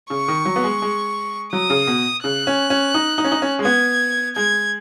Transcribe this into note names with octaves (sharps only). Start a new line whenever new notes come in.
C#3 C#6
D#3
F#3
B3
G#3
G#3
F#3 D#6
C#3
B2
C#3 F#6
C#4
C#4
D#4
D#4
C#4
D#4
C#4
G#3
B3 G#6
G#3 G#6